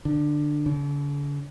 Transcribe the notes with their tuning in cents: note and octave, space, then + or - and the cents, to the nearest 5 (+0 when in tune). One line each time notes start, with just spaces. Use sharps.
D3 +15
D3 -45